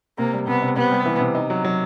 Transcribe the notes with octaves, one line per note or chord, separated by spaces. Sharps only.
C3 A#3
G3
C3 B3
C3
C3 B3
G3
E3
C3
D#4
F#3
F#3